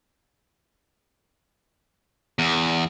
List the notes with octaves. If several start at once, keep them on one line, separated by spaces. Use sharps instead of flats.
E2